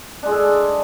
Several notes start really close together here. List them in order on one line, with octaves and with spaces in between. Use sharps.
D4 G#3 G#4 A4